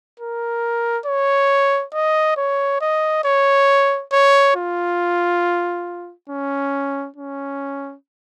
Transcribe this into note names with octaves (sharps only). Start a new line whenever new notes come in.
A#4
C#5
D#5
C#5
D#5
C#5
C#5
F4
C#4
C#4